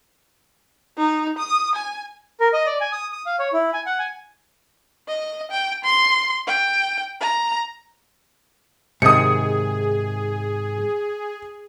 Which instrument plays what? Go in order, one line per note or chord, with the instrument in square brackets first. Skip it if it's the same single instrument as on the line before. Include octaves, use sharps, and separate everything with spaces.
[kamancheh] D#4
D#6
G#5
[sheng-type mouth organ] A#4
D#5
D5
G#5
D#6
D#6
F5
C#5
E4
G#5
F#5
G#5
[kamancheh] D#5
G5
C6
G5
A#5
[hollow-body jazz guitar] G#2 [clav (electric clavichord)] C3 D#3 [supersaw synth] G#4 [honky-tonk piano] D#6 C#7